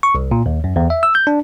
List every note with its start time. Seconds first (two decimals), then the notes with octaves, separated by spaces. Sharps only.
0.03 C#6
0.15 C2
0.31 A#2
0.46 D#2
0.64 F#2
0.76 E2
0.90 E5
1.03 E6
1.15 G6
1.27 D4